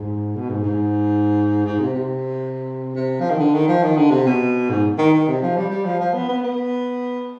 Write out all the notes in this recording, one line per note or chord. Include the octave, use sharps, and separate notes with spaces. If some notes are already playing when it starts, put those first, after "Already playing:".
Already playing: G#2
B2
G#2
G#2
G#2
C3
C3
C3
F3
D#3
D3
D#3
F3
D#3
D3
C3
B2
G#2
D#3
D#3
C3
F3
G3
G3
F3
F3
B3
B3
B3